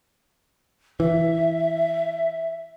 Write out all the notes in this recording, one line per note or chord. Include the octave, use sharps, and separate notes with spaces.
E3 E5